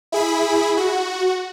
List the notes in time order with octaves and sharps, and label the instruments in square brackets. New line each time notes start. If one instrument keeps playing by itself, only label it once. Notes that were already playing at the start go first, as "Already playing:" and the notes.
[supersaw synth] E4 G#4 B5
F#4